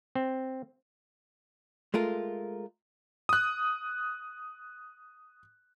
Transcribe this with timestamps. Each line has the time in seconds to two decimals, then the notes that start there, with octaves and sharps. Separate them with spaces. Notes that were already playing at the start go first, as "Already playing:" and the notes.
0.15 C4
1.94 G#3 A3 F4 A#4
3.29 D#6 F#6